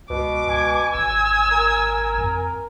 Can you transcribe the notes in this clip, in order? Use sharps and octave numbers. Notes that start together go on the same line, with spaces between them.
C#2 B2 D6
C#2 G#5
G#1 E6
A#4
F2